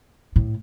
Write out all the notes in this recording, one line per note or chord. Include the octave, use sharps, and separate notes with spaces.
A2